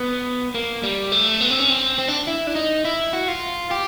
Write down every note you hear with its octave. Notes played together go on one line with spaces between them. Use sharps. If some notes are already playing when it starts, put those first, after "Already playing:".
Already playing: B3
A#3
G3
A3
B3
C4
C#4
C4
C4
D4
E4
D4
D#4
E4
F#4
F4
G4